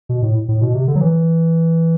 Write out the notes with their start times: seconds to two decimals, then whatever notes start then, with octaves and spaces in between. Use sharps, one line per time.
0.09 B2
0.23 A2
0.48 A2
0.61 B2
0.74 C3
0.88 D3
0.95 F#3
1.01 E3